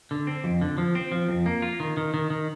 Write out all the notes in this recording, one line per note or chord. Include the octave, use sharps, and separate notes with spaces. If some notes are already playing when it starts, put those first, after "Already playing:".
D3
C4
F2
D3
F3
C4
F3
F2
A#3
F4
D#3
D#3
D#3
D#3